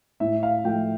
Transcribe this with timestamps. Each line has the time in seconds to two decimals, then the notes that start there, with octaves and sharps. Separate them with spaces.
0.20 A2 E5
0.43 F5
0.64 F3 A3 G5